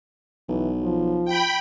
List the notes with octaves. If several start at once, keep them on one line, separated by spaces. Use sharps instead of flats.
B1 E3
F3
G5 B5